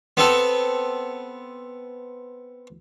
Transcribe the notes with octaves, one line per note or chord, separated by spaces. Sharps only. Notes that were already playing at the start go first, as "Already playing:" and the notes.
B3 C4 A4